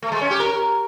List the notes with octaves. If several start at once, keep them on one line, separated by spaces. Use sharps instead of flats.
A3
G#3
C#4
G4
A#4